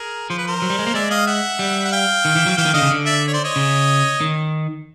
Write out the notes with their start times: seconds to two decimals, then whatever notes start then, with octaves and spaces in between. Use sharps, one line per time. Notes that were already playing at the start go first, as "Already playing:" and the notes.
Already playing: G#4 A#4
0.30 F3 C5
0.38 B4
0.47 A#4 C5
0.62 F#3
0.70 G3
0.79 G#3
0.87 A#3
0.94 G#3 D5 E5
1.10 D#5 F5
1.27 E5 F#5
1.59 G3
1.85 F#5
1.92 F5 G5
2.25 D#3
2.36 E3
2.46 F#3
2.57 E3 F5 G5
2.66 D#3
2.74 D3 D#5 F5
2.82 C#3
2.91 D3
3.06 D5 E5
3.27 C#5
3.33 C5 D5
3.44 C#5 D#5
3.56 C#3
4.21 D#3